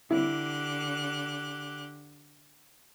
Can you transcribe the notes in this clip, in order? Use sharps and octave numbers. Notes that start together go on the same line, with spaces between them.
D3 E4 G4 F#6